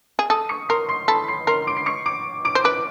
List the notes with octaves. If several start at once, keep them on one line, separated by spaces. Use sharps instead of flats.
G#4
A4 D#6 D#7
C#6 C#7
A#4 C6 C7
C6 C7
A4 B5 B6
C6 C7
A#4 C6 C7
D6 D7
C7
C#6 C#7
D6 D7
D6 D7
C5
B4 D6 D7